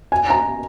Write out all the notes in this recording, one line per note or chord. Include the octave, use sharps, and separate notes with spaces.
G#5
A#5